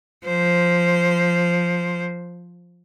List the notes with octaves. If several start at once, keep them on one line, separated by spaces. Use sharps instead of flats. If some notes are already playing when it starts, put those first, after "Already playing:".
F3 C5